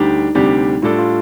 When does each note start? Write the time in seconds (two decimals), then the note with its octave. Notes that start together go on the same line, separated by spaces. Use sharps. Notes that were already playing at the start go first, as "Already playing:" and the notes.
Already playing: D2 G3 D4 D#4 G4
0.35 D2 C3 G3 D4 G4
0.82 A2 G3 D4 F4 A4
0.99 F4